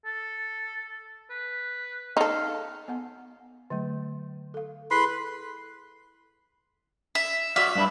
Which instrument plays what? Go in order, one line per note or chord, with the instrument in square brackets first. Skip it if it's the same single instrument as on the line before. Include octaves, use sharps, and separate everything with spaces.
[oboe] A4
B4
[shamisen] D#4 A4 [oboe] F5
[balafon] B3 F#5
D3 F#3 A3
A4 F5
[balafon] E4 G#4 A4 [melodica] B4 B5 C6
[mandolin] E5
[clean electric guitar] F#4 D5 F5 [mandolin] E5
[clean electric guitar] G2 D4 E4